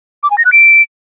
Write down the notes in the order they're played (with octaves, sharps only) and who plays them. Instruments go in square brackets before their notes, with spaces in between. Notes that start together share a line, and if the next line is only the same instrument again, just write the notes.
[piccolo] D6
G#5
A#6
F#6
D7